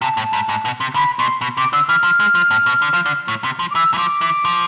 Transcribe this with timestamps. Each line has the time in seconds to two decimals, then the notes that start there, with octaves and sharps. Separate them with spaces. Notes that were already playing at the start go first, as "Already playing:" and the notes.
0.02 C3 A5
0.17 A2
0.33 G#2
0.49 G#2
0.65 B2
0.80 C3
0.95 D3 B5
1.19 B2 C6
1.41 B2
1.57 C3 D6
1.73 D3 E6
1.88 E3 F6
2.04 F3
2.20 G#3
2.35 F3
2.51 A2
2.66 B2
2.82 D3
2.94 F3
3.06 D3
3.28 A2
3.44 C3
3.59 F3
3.71 D6
3.75 E3 E6
3.94 E3
3.98 F3 D6
4.21 E3
4.45 F3